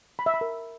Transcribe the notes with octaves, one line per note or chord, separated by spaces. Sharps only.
B5
E5
B5
A#4